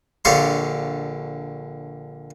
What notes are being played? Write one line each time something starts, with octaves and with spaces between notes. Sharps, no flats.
A#1 D3 G4 C#5 F5 C6